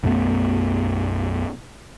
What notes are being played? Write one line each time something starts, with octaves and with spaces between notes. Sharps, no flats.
B1 F#2 A3 B3